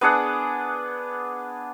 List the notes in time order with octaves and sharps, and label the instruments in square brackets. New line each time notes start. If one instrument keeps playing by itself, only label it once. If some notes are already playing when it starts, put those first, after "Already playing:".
[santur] B3 D4 G#4 F#5